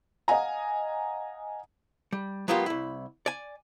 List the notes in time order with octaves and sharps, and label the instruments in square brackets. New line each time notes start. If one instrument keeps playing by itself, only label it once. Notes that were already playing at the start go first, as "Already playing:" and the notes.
[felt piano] D#5 F5 F#5 G#5 A#5
[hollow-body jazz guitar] G3
F#3 G#3 A#3 B3 F4 G4
C2 E4
D5 G#5